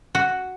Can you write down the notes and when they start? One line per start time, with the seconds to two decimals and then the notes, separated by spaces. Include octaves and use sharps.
0.15 F#4